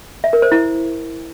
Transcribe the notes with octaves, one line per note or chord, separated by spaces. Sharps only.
E5
A#4
C5
E4